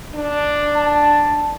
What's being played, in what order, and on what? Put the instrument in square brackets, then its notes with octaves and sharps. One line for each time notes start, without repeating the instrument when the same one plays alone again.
[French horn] D4
[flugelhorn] A5